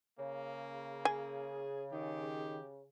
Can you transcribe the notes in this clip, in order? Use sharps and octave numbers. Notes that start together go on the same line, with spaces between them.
C#3 A#3
G#4 G#5
D#3 G4